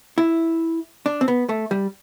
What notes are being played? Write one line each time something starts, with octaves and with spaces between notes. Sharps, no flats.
E4
D4
C4
B3
A3
G3